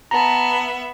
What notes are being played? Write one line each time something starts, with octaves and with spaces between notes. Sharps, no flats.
B3 E5 A5 A#5